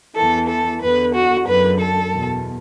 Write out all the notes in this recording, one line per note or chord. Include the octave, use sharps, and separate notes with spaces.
E2 E3 A4
A4
E2 D3 B4
F#4
F#2 D3 B4
A4
E2 B2